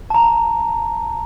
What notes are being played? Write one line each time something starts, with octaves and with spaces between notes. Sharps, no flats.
A5 A#5